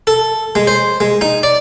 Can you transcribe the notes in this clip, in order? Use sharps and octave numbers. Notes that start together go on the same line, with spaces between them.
A4
G#3
C5
G#3
D#4
D5